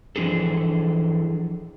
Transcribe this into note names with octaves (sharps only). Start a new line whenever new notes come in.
E3 F3 D4 G#4 A4